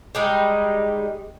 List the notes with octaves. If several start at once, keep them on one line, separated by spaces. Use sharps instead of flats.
G3 G#3 D#4